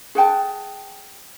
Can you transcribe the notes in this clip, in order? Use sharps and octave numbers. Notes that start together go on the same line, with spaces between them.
G#4 F#5 G5 A5